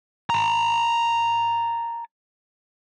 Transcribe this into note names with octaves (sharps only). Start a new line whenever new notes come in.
A5 A#5